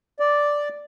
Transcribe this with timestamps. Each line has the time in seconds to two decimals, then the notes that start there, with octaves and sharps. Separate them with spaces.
0.20 D5